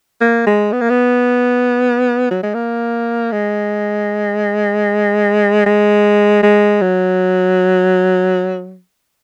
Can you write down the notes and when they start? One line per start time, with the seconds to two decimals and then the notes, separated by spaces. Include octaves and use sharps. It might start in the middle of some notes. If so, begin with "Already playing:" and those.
0.21 A#3
0.46 G#3
0.72 B3
0.81 A#3
0.90 B3
2.30 F#3
2.43 G#3
2.54 A#3
3.32 G#3
5.66 G#3
6.43 G#3
6.81 F#3